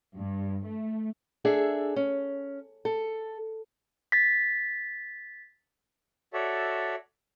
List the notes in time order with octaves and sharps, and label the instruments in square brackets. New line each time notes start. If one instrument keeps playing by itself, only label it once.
[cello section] G2
A3
[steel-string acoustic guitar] D4 G#4 A4 E5
C#4
A4
[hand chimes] A6 B6
[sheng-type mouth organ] F#4 A4 C#5 D5 E5